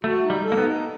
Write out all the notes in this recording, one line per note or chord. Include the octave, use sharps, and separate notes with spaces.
A3 F#4
D#4
G3
A4
A#3
B3
D#4